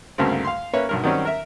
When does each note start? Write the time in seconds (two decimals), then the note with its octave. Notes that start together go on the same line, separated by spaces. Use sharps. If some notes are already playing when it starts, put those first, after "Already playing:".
0.18 D2 G2 C#3 A3 A#3 C4
0.44 F5 C6
0.73 A#3 C#4 B4 C#5 E5
0.89 B1 G2 A#4
1.03 D#3 F#3 G3 C4 C#4
1.25 A#4 E5